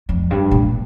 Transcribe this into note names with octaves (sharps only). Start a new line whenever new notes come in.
F2
G2
A#2